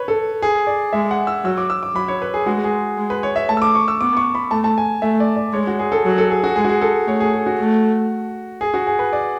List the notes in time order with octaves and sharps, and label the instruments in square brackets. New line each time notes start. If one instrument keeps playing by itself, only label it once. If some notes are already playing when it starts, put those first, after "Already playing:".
Already playing: [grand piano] B4 C#5
A4
G#4
D5
[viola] G#3 [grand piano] E5
[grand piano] F#5
E6
[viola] F#3 [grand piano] E6
[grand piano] D6
E6
D6
[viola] F#3 [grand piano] B5
[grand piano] C#5
B4
G#4
[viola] G#3 [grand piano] F#4
[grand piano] G#4
[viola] G#3
[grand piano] B4
C#5
E5
[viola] A3 [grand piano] A5
[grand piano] E6
D6
C#6
E6
[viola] B3 [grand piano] D6
[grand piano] C#6
B5
[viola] A3 [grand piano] A5
[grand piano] A5
G#5
[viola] A3 [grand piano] E5
[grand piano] D5
D5
[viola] G#3 [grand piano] C#5
[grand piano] F#4
G#4
A4
[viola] F#3
[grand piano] A4
G#4
F#4
[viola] G#3 [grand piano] G#4
[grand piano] F#4
G#4
A4
[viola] A3 [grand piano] C#5
[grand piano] G#4
G#4
F#4
[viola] A3
[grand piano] G#4
F#4
G#4
B4
D5